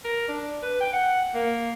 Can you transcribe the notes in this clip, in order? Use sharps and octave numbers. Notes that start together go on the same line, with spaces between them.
A#4
D4
B4
G5
F#5
A#3